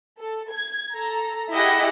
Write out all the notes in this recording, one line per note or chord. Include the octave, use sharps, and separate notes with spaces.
A4
G#6
A4 A#5
E4 G4 G#4 D#5 E5 F#5